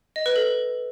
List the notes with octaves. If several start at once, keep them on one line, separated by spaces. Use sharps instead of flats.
D#5
B4
A4